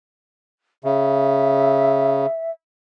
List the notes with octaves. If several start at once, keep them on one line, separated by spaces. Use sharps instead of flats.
C#3 E5